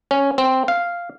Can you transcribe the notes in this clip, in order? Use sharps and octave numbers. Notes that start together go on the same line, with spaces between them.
C#4
C4
F5